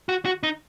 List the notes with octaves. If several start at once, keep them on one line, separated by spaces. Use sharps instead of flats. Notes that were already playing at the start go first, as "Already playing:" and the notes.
F#4
F#4
D#4